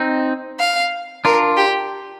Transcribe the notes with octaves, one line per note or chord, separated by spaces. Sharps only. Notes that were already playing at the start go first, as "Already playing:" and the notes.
Already playing: C4 D#4
F5
D4 F4 A#4
G4